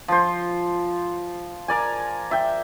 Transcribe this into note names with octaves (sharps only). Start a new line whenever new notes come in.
F3 C5
A#4 D5 G#5
E5 G5